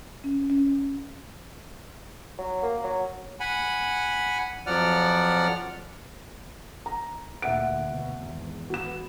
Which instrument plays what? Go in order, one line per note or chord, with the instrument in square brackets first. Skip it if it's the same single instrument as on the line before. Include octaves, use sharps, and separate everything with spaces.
[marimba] C#4
C#4
[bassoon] F#3
A#3
F#3
[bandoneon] F#5 G#5 B5
F2 F3 F#3 D5 F#5 F6
[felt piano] A#5
[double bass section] D2 A#2 D3 [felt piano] E5 F#5 D7
[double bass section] B2
G#1 E2
[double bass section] B3 [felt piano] F#4 E7